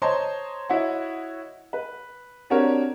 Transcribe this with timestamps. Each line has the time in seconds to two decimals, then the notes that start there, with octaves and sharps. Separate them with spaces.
0.02 C5 C#5 D#5 A5 A#5 C6
0.70 E4 F#4 C#5 D#5 F#5
1.73 B4
2.50 C4 D4 F#4 G4 A#4 C#5